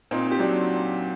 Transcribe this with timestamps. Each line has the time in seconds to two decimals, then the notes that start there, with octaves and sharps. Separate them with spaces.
0.11 A#2 C4 D#4
0.31 G4
0.39 F#3 D4 F#4